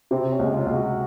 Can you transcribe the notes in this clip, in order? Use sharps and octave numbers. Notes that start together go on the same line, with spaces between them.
C3 C4
C#4
C#2
F4
C#2
F#4